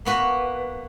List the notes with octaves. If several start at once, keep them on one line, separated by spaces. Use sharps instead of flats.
A#3 B3 F#4 B4